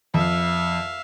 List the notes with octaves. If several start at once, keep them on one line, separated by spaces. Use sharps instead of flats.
F2 E5 F5